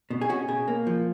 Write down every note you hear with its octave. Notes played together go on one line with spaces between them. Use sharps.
B2
G#4
C#4 F#4
B2 G#4
A#3
F3